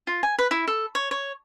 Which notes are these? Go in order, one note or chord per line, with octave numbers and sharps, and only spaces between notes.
F4
G#5
B4
E4
A4
C#5
C#5